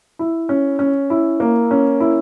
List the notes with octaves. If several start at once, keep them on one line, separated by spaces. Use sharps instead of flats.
E4
C#4
C#4
E4
A#3
C#4
E4